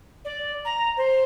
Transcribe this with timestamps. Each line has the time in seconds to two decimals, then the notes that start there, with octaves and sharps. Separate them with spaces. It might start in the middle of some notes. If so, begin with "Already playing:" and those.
0.24 D5
0.65 A#5
0.97 C5